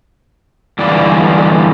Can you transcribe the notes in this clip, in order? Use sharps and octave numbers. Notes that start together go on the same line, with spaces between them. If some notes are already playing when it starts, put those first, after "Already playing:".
G2 D3 E3 D4 F4